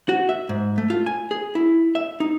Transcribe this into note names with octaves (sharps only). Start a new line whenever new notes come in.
F#4
E5
G#2
A3
F4
G#5
G#4
E4
E5
D#4